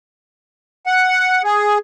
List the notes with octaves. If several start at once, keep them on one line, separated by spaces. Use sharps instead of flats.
F#5
G#4